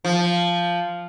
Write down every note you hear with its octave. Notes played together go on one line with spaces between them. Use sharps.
F3